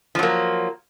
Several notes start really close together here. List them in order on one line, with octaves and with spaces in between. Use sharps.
F3 F#3 A#3